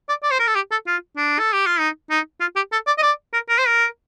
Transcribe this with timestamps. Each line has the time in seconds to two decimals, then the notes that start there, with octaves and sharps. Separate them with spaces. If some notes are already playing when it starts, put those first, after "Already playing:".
0.09 D5
0.23 D5
0.31 C5
0.39 A#4
0.47 A4
0.55 G4
0.71 A4
0.87 F4
1.17 D4
1.39 A4
1.53 G4
1.66 F4
1.79 D#4
2.10 D#4
2.40 F4
2.56 G4
2.72 A4
2.87 D5
2.98 D#5
3.02 D5
3.33 A#4
3.49 A#4
3.59 C5
3.67 A#4